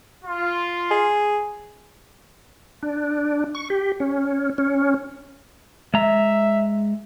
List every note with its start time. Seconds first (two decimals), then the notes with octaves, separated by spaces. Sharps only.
0.24 F4
0.91 G#4
2.83 D4
3.55 C#6
3.70 G4
4.00 C#4
4.58 C#4
5.94 G#3 E5 A#5